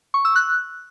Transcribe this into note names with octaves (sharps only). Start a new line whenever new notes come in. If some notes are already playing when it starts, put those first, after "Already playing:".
C#6
E6
F#6